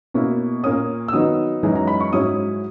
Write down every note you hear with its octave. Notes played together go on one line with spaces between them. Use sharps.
B2 A#3 C#4 E4
A#2 A#3 C#4 D#6
E6
D#3 F#3 B3 D#4 D#6
F#2 E3 G#3 D#4
A#5
B5
C#6
G#2 F#3 C#4 E4 D#6